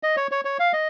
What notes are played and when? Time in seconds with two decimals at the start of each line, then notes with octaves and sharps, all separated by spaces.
0.03 D#5
0.17 C#5
0.31 C#5
0.45 C#5
0.60 F5
0.73 D#5